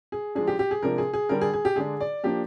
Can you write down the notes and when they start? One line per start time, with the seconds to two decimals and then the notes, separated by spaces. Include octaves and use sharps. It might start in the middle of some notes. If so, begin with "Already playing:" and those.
0.12 G#4
0.35 F3 G#3 D4 G#4
0.47 G4
0.59 G4
0.71 G#4
0.83 C3 F3 G#3 D4 A#4
0.98 G#4
1.13 G#4
1.29 D3 G3 D4 A#4
1.41 G#4
1.53 G#4
1.65 G4
1.76 D3 G#3 D4 G#4
2.00 D5
2.24 F3 A#3 D4 G4